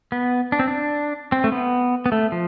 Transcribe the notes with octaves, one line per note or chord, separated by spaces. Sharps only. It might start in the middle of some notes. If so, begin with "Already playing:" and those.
B3
D4
C4
D4
C4
A3
B3
B3
A3
F3